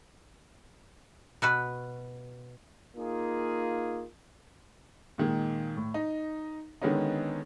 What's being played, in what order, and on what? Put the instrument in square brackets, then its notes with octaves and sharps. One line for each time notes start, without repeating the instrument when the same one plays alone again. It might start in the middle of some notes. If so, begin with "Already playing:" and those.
[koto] B2 F#4 B4
[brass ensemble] A#3 D#4 F4 G#4
[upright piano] A#2 D#3 G#3
A2
D#4
D3 D#3 G#3 B3 C#4 D#4